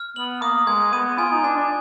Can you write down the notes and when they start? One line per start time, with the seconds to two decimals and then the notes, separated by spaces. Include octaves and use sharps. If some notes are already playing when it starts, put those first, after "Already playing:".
Already playing: F6
0.16 B3 F#7
0.42 A#3 D#6
0.67 G#3 G#6
0.93 B3 D#7
1.18 F4 G#5
1.31 D#4
1.44 D4 G#5
1.56 D4